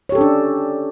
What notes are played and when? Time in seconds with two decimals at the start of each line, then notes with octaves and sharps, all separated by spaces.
0.09 C#5
0.12 G4
0.15 A4
0.18 C#4
0.21 D4